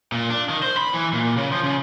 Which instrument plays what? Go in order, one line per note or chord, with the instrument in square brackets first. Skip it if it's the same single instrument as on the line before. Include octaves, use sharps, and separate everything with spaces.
[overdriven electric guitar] A#2
D4
D#3
C5
B5
E3
A#2
C#3
F3
C#3